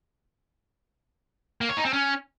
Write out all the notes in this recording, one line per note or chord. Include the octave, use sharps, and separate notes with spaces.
A#3
C#5
D#4
C4
C#4